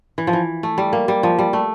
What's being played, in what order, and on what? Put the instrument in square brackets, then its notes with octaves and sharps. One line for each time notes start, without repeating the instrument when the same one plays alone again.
[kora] E3
F3
E3
A3
G3
A#3
G3
F3
G3
A3